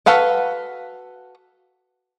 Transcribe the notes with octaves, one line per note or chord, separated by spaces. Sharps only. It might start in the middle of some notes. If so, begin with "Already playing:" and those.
F#4 A4 B4 F5 F#5